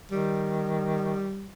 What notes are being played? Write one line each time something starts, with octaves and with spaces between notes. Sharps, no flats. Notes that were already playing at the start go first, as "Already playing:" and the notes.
D#3 G3